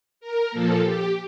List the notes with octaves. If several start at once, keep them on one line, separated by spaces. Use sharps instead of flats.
A#4
A#2 F3 A#3 A4
G4